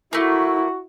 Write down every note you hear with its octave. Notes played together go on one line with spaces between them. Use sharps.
A3 A#3 E4 F#4